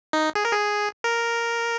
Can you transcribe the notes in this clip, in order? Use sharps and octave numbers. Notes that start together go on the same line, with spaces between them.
D#4
G#4
A#4
G#4
A#4